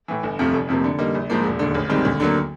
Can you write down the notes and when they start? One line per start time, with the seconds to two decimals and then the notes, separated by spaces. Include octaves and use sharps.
0.08 A2 E3
0.23 G1
0.39 F2 C3 F3 A3
0.53 F1
0.68 F2 C3 F3 A#3
0.84 D3
0.98 G3 A#3 D#4
1.15 A#1
1.30 G#2 F3 A#3
1.44 E1
1.59 D#2 D3
1.74 A1
1.89 G#2 D#3 G3 C4
2.05 D2
2.20 D3 F#3 A#3